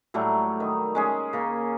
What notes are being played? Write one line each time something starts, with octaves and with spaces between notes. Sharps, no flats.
A2 F#3 G3 A3
D#3
G#3 C#4 G#4
C#3 A#3